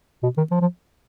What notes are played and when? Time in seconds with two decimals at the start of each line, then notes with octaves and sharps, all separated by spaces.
0.23 B2
0.37 D#3
0.51 F3
0.61 F3